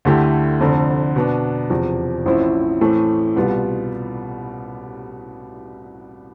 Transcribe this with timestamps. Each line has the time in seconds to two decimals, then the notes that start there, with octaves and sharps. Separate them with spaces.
0.05 D2 D3 A3 E4 G4
0.61 F1 F2 D3
1.16 B2 B3 D4
1.70 E2 C3 F3
2.26 A1 A2 F3 C4 E4
2.81 A2 E3 A3 C4
3.36 C2 B2 G3 B3 F4